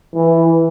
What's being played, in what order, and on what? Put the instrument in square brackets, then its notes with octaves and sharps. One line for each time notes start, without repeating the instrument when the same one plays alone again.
[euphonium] E3